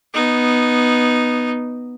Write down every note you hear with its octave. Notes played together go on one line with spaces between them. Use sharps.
B3 D#4